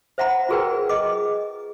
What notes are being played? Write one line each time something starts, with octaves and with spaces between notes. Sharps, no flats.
C5 E5 F#5 A#5 B5
F4 F#4 G#4 A#4 B4 G5
G#4 D#5 D6